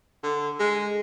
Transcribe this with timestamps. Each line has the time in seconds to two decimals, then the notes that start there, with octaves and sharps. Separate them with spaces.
0.23 D3
0.59 G#3